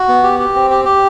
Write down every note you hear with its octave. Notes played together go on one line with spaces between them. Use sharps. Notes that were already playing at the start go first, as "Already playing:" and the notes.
Already playing: F#4
B3
G4
G4
C4
G4
G4